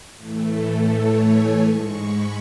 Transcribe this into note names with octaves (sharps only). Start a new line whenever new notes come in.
A2 E3 A3
A4
C#5
G#5
G#2 G#3 C#6
B5